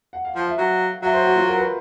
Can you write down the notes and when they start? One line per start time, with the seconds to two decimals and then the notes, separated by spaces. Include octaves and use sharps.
0.13 F#5
0.25 F5
0.35 F3 F5
0.47 E5
0.58 F#3
1.02 F#3 E5
1.14 C5
1.24 F#4
1.36 F4
1.47 A#4
1.58 B4